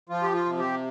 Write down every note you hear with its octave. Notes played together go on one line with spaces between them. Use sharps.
F3 F4
G4
F4
C3
G4